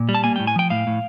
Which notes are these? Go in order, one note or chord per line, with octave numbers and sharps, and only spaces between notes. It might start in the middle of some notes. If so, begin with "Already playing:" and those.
Already playing: A#2
G3
A5
A#3 G#5
G5
A2
G#5
F3 G5
A2 F5
A2